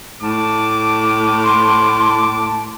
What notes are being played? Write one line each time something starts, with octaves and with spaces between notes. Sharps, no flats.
A2 A5 D6
C6